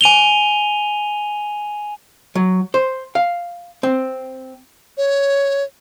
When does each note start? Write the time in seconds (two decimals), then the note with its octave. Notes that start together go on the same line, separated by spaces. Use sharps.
0.01 G#5 D#7 F7 G7
2.35 F#3
2.74 C5
3.15 F5
3.83 C4
4.97 C#5